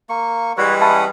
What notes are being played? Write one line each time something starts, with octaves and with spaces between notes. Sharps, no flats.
A#3 C#6
E3 G3 G#3 F#4 B4 C#5
C#4 E5 F#5 A5 B5 D#6